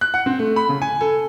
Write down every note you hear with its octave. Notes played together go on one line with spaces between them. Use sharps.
F#6
F#5
C4
A3
B5
C#3
G#5
A4